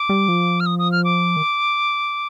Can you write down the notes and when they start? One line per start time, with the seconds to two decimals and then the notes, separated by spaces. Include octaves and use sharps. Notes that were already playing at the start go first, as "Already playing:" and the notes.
Already playing: D6
0.09 G3
0.28 F3
0.60 F6
0.66 D#6
0.79 D#6
0.92 F6
1.04 D6
1.37 D#3